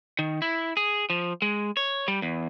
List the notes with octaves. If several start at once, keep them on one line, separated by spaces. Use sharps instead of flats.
D#3
E4
G#4
F3
G#3
C#5
G3
E2